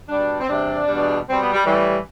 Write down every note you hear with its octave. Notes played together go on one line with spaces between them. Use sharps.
B2 G3 D4
C4
E2 C3 G3 D4
E2 B2 G3
B2 G3 C4
B3
G3
A2 E3 G3